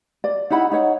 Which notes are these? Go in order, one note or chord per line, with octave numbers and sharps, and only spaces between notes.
D5
D#4 E4 F#5 B5
D#4 C#5 F#5